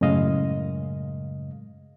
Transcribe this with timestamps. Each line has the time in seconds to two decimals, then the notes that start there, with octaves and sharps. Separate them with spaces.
0.01 F#2 A2 C#3 G#3 D#5 F5